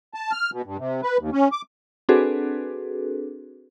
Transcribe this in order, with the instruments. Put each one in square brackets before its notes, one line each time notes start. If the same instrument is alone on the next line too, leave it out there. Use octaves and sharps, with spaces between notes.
[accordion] A5
F6
B2
G2
C3
B4
D#2
C#4
D6
[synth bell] C4 D4 F#4 G#4 A4 B4